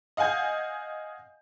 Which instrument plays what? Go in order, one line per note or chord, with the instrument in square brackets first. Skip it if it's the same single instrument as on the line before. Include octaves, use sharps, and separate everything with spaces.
[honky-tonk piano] D#5 F5 F#5 G#5 G6